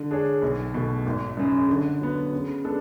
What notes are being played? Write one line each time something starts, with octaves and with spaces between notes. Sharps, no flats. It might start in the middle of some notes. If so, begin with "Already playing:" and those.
Already playing: D3
G#3 D4 G#4 C#5
B1
B2 A3
G#1
F#2 C#3 G#3
D3
F#3 B3
C#3
G#3 B3 D4 A4